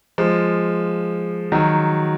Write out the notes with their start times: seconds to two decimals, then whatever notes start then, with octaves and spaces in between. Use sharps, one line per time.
0.18 F3 G#3
1.52 D#3 F#3